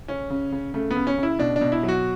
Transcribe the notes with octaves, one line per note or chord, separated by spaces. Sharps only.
C#3 C#4
C#3
C#3
C#3 A3
B3
C#3
C#4
C#3
E4
B2 D4
D4
B2
E4
F#3
F#4